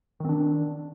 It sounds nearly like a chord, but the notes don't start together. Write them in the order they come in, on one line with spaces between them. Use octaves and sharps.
D#3 C4 D4